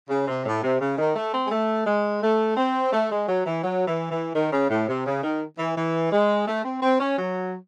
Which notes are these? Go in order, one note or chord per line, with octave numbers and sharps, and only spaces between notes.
C#3
C3
A2
C3
C#3
D#3
A3
C4
G#3
A3
G#3
A3
C4
A3
G#3
F#3
E3
F#3
E3
E3
D#3
C#3
A2
C3
C#3
D#3
E3
E3
G#3
A3
C4
C4
C#4
F#3